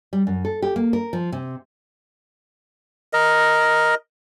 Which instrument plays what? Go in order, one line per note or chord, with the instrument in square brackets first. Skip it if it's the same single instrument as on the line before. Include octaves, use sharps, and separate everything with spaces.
[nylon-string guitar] G3
F#2
A4
G4
A#3
A#4
F3
C3
[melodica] A#4 D#5